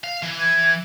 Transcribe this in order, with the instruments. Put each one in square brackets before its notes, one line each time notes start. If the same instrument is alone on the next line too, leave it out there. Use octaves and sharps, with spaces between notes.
[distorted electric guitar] F5
E3
[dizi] G#6